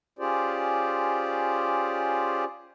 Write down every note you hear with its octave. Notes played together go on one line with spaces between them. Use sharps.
C#4 F4 G4 G#4 C5 D5